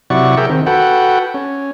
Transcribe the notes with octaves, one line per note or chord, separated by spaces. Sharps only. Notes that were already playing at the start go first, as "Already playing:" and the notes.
C3 F#3 E4 D5 F#5 C#6
G#4 A#4 E5 G5
D#3 C4
F#4 A4 B4 F#5 G5
C#4